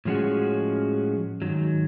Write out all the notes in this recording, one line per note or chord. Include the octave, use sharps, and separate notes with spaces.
A2 F3 G#3 C#4 F#4
G#2 D#3 F#3